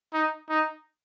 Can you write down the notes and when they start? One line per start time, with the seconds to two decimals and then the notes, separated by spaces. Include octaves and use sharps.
0.13 D#4
0.49 D#4